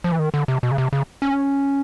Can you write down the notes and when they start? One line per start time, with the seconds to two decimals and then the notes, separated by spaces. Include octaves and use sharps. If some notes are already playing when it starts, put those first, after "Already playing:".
0.04 F3
0.12 E3
0.19 D#3
0.34 D3
0.48 C3
0.63 B2
0.71 C#3
0.78 C3
0.93 C#3
1.22 C#4